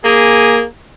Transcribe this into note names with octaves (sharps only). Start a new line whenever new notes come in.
A#3 G#4